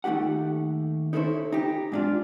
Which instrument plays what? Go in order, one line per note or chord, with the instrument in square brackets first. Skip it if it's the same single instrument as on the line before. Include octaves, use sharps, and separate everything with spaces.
[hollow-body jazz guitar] D#2 A3 D#4 G4 F#5
D#4 E4 A4 A#4 C5 C#5
D#4 G4
G#2 D4 F4